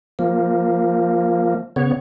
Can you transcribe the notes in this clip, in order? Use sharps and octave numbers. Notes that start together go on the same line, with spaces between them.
F3 A#3
C#3 B3 C#5